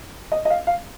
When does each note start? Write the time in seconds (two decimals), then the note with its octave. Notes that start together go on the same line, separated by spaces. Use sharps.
0.32 D#5
0.45 D#5
0.50 F5
0.67 F5